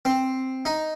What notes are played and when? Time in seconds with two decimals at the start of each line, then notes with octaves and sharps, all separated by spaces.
0.05 C4
0.65 D#4